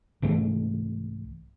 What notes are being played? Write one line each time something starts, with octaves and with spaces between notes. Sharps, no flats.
C2 G#2 E3 A3